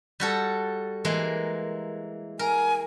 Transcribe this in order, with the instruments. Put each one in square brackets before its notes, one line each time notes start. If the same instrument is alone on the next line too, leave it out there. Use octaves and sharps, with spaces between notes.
[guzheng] G3 F#4 A4
E3 G#3 A#3
[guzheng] A#4 [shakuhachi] G#5